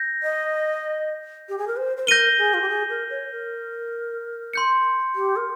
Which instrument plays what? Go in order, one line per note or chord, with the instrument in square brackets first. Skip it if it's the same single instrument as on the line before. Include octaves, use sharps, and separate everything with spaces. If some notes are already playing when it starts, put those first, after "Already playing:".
Already playing: [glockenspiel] G6 A#6
[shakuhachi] D#5
G4
G#4
A#4
C5
C5
[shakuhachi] A#4 [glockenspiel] G6 A#6 D#7 G7
[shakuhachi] G#4
F4
G4
G#4
A#4
C#5
A#4
[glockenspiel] C6 G6 C#7
[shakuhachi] G4
A#4